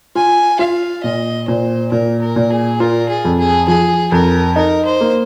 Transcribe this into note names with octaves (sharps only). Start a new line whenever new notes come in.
F4 G#5
F4 F5
A#2 D#5
A#2 C5
A#2 A#4
A#4
A#2
G#4
F4 A#4
G#4
F2
G#4
F3 G#4
F2 A#4
D#4 A#4
C5
A#3